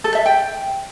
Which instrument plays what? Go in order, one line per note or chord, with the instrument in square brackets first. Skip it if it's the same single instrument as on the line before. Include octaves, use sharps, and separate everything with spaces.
[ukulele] A4
E5
G5